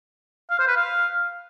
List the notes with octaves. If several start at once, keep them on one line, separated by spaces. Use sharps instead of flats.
F5
C5
B4
F5